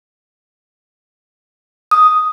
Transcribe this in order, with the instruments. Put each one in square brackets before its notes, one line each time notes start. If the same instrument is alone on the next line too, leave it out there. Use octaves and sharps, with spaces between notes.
[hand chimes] D#6